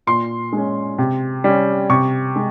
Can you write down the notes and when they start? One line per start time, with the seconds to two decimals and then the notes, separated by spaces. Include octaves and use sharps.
0.07 A#2 C6
0.53 G#3 C#4
0.98 C3
1.44 G3 C#4
1.89 C3 C#6
2.36 G#3